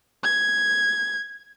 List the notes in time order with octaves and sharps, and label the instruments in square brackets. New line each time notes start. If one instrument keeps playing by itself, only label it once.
[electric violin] G#6